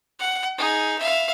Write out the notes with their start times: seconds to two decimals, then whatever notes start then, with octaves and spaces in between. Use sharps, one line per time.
0.19 F#5
0.57 D#4 G#4
0.99 E5 F5